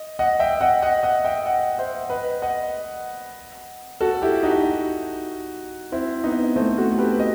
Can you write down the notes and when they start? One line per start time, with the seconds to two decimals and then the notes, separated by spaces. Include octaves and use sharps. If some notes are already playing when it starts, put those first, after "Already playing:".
Already playing: D#5
0.19 D#5 F#5
0.40 E5 G5
0.61 D#5 F#5
0.83 D#5 F#5
1.03 D#5 F#5
1.24 E5 G5
1.46 D#5 F#5
1.78 C5 E5
2.10 B4 D#5
2.42 D#5 F#5
4.01 F#4 A4
4.22 E4 G4
4.43 D#4 F#4
5.92 C4 E4
6.24 B3 D#4
6.56 A3 C4
6.77 F#4 A4
6.98 G4 B4
7.20 D#5